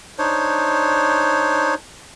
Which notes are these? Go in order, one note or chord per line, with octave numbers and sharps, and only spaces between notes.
D4 D#4 C5 C#5